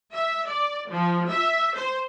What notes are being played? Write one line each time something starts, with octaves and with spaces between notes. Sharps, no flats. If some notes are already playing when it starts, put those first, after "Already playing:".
E5
D5
F3
E5
C5